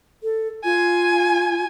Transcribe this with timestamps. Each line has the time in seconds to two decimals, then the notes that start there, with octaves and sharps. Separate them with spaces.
0.23 A4
0.65 F4 G#5